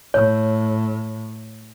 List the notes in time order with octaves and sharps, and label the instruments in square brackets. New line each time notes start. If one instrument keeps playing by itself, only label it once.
[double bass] A2 [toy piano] C#5